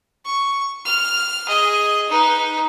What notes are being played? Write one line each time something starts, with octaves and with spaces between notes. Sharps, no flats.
C#6
F6
G#4 D#5
D#4 B4